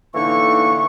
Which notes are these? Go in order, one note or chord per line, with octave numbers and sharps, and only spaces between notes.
A2 D3 E3 A#3 D#4 C#6